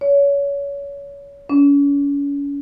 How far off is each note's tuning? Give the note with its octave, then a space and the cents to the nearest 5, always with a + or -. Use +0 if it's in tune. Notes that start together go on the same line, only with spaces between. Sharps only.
C#5 +25
C#4 +35